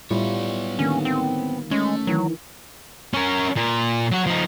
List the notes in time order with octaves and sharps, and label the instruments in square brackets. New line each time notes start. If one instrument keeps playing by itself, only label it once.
[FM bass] A2 [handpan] G3 E4 F4 [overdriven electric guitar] B3 C#5
[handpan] D3 D#3 A#3 [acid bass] C#4
[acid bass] C4
[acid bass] G#3 [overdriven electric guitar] A3 [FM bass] C#4
[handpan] D#3 E3 [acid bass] F#3
[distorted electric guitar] C#4 A#4
A#2
F#3 F#4
F3 D#4